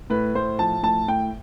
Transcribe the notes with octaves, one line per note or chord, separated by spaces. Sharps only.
A2 B4
A2 C5
F3 A5
A2 A5
A2 G5